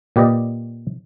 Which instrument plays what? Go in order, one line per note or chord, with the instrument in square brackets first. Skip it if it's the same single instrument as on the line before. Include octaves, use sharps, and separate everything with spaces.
[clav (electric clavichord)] A#2 G4 B4 D5 D#5